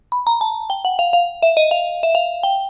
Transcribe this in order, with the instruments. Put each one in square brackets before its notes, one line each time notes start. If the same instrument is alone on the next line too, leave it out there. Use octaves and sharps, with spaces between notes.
[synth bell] B5
A#5
A5
G5
F#5
F5
F5
E5
D#5
F5
E5
F5
G5